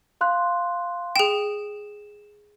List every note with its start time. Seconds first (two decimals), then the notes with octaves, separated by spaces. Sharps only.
0.21 F5 C6 F#6
1.16 G#4 G5 E7